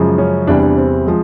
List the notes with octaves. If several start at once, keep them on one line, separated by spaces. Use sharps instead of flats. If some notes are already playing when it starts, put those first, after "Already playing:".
Already playing: F#2 C#3 F3 G#3
C#4
E2 C3 E3 G3 D4
D4
C4
F3 G#3